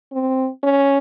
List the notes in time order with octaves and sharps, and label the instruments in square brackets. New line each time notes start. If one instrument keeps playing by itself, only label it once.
[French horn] C4
C#4